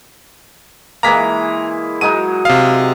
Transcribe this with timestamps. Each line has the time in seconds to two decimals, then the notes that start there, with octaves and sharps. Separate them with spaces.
1.03 E3 G#3 A#3 A#5 B6
2.01 F#3 G#3 D#4 D#7
2.45 C3 F5